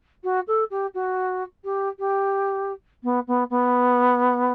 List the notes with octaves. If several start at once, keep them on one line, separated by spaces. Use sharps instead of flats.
F#4
A4
G4
F#4
G4
G4
B3
B3
B3